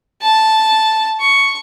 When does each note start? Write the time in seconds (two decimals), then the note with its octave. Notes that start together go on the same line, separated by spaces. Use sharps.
0.21 A5
1.20 C#6